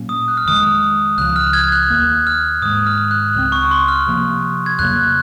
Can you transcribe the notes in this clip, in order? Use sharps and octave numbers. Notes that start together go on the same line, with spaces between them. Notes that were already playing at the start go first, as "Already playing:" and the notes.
Already playing: A#2 F#3 A#3 C#4
D#6
F#6
F6
F2 D#3 G#3 D#6
F6
C#2 C#3 F3 F#6
F6
F6 G#6
F#6
D#2 D#3 A#3
F6
G#2 D#3 G#3 D#6
F6
F#6
C#2 C#3 G#3 C4 F6
C#6
C6
F6
C3 F3 A#3
G#6
F2 C#3 F#3 A#3 F#6
F6